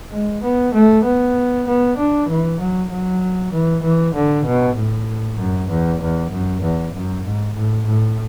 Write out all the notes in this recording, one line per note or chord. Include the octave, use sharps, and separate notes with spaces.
G#3
B3
A3
B3
B3
D4
E3
F#3
F#3
E3
E3
D3
B2
A2
F#2
E2
E2
F#2
E2
F#2
G#2
A2
A2